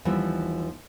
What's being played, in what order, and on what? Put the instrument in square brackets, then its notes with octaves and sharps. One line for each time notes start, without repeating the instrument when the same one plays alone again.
[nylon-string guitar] D#2 E3 F3 G3 B3